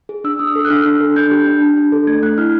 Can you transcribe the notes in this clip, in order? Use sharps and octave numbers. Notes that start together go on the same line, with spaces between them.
G#4
D4 E6
D4 D#6
E6
A4
F#6
D4 F6
D4
A4
D4 G6
G4
D4
D4
D4
A4
A3 G#6
A3 F#6
E4 F6